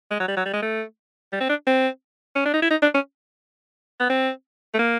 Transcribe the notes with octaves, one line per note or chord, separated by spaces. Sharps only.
G#3
F#3
G3
F#3
G3
G#3
A3
G3
C4
D4
C4
C#4
D4
D#4
E4
D#4
D4
C#4
B3
C4
A3
A#3